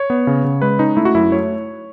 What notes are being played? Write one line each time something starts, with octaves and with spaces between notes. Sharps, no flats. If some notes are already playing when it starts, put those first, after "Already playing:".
Already playing: C#5
B3
C#3
C#3
G#3 B4
C#4 D#4
A3 E4
F#4
F#2 E4
A3 C#5